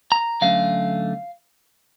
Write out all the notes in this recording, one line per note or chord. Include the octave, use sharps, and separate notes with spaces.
A#5
D3 F#3 A3 C#4 F5